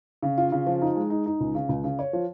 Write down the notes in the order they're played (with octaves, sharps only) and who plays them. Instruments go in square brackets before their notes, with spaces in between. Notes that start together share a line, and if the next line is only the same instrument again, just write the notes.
[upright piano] C#3
F4
C#3
F3
D#4
G#3
D#4
D#4
C#2
C#3
C#2
C#3
C#5
F3